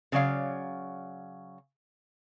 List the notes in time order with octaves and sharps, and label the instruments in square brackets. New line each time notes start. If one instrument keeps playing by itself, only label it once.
[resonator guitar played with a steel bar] C#3 F#3 D5 F5